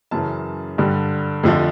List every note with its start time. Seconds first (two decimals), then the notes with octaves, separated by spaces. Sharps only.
0.11 F#2 C#3 E3 A5
0.78 G2 D3 G3
1.43 F2 D3 F3 A3